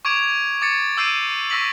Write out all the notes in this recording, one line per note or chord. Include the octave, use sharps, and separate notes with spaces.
C#6 D6 G#6 D7 F7
D6 A6 C#7
D6 E6 G6 C7 D7 D#7
C#6 E6 A#6 B6 F#7